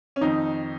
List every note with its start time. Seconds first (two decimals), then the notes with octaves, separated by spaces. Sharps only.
0.16 C#4
0.21 F2 D#3 D#4